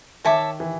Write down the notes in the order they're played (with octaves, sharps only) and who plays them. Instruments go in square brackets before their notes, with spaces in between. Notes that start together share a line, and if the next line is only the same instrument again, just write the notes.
[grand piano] D#3 [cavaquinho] C#5 E5 A5 D6
[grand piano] E3